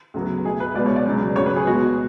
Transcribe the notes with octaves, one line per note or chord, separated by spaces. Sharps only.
D2 C#3 F#3 B3
B2 A3 G#4
B4
C#2 B2 G#3 B3 D5
C#5
D5
C#2 C#3 F#3
D2 C#3 F#3 C#5
B4
G#4
B2 G#3 B3 F#4